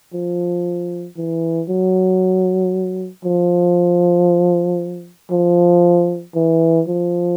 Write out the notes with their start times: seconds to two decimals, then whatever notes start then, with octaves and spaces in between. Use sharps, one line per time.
0.13 F3
1.17 E3
1.69 F#3
3.25 F3
5.31 F3
6.35 E3
6.88 F3